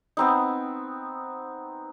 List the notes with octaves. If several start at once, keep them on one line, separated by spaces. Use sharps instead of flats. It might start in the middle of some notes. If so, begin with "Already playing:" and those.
B3 C4 D#4